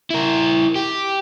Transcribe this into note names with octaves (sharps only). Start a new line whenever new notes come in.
E4 A#4
G4